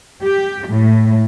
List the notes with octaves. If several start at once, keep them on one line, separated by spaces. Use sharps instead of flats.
G4
A2